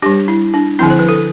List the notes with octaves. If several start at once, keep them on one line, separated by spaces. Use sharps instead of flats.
G3 D4 G4
E4
D4
D3 F3 C4 E4
C5
B4
A4